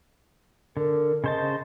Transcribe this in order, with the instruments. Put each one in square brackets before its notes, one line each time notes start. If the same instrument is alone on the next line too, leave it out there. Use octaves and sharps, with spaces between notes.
[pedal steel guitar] D3 [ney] A#4
[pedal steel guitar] C#3 C5 A5 [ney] D#5